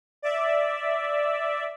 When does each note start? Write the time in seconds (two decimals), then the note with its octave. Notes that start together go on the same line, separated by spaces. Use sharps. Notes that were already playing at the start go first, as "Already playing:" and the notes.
0.22 D5 E5